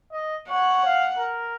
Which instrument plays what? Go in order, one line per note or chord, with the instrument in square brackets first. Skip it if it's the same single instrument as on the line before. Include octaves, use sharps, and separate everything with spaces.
[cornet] D#5
[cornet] C#5 [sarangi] F#5
[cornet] F5
A#4